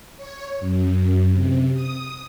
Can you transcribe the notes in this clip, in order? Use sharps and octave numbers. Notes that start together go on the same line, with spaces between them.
C#5
F#2
C3
D#6